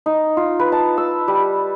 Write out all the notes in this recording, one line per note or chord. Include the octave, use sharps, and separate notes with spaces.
D#4
F4
B4
A5
E6
G3